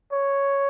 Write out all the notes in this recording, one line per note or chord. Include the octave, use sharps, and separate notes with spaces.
C#5